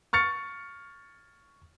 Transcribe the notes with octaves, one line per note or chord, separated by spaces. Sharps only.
C#6 F6 A6 C#7